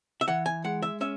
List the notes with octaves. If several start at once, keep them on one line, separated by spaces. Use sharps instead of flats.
E5
E3 F#5
G#5
G#3 F#5
E5
C#4 E5